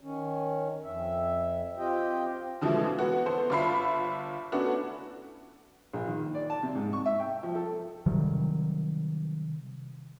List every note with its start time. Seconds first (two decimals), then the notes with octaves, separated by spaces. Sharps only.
0.01 D#3 C#4
0.84 F2 E5
1.78 C4 F4 G4 D#5 G5
2.61 B2 D3 E3 F3 G#3 A3
2.99 B3 F#4
3.26 B3 A4 C5
3.50 G1 D4 F4 E5 B5 C7
4.52 A3 B3 C#4 D4 E4 F#4
5.93 A#1
6.08 D#3
6.35 D5
6.50 A5
6.63 C3
6.75 G#2
6.93 C#6
7.06 E5
7.20 G5
7.43 F3
7.55 A4
8.06 C3 D#3 F#3 G3